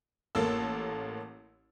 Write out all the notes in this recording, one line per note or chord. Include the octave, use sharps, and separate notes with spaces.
A1 A#3 A4 E6